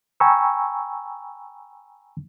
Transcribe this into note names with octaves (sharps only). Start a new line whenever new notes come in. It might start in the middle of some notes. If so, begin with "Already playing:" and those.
G5 G#5 A#5 B5 C#6 E6